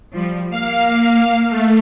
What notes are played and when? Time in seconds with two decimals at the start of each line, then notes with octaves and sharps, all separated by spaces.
0.13 F3 G3
0.51 A#3 F5
1.49 A3